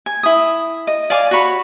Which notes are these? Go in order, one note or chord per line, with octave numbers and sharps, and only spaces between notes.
G#5
E4 D#6
D#5
D5 F5 G#5 D6
F#4 C#5 B5